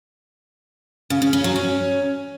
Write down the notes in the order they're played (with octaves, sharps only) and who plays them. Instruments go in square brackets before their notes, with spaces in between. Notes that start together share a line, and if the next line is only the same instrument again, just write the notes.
[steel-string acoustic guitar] C#3
C#3
C#4
F#3
C#4